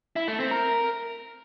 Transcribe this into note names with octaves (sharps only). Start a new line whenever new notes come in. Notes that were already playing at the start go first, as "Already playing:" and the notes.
E4
A3
C4
A#4